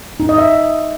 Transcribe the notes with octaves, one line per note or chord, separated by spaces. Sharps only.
D#4
D#5
E5